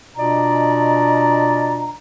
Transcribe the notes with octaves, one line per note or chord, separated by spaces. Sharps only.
B2 D4 F4 D5 D#5 A#5